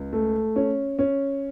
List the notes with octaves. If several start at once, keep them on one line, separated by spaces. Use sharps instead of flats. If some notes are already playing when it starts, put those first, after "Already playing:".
Already playing: C#2
A3
C#4
C#4